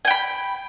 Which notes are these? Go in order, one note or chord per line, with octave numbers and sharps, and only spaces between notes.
G5 G#5 B5